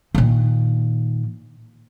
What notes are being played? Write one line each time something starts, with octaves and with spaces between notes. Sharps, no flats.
A#2 D#3